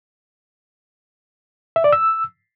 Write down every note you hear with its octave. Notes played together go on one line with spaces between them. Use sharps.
E5
D5
E6